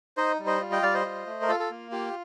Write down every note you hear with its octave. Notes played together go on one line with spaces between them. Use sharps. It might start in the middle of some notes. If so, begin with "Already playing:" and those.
D#4 C5 D#5
G3
C5 D#5
F4
D#5 G5
G3 D5 F5
C5 D#5
F4
A3
A#4
F4 A4
A4
A#3
F4 G4